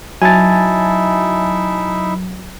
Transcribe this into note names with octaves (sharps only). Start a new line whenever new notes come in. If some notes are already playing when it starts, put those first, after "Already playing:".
F#3 D#4 E4 E5 G#5 A5 A6